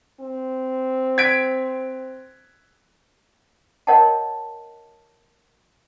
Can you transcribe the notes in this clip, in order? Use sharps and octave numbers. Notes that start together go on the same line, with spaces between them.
C4
G#6 B6 D7
A#4 C#5 D#5 F#5 G5 A5